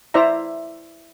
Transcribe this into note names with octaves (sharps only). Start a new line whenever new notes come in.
E4 C5 D5 E5 A#5